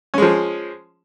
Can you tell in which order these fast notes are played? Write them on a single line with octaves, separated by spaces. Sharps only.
C#4 G#3 F3